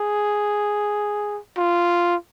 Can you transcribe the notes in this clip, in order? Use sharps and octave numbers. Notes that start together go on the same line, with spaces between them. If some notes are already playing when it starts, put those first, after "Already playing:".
Already playing: G#4
F4